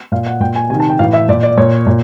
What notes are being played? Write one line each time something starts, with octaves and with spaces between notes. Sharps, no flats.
A#2 F5
F#5
A#2 G5
G#5
C3 D#3 G#5
A5
G5
A2 E3 F5
E5
A#2 D5
D5
A#2 C#5
A#2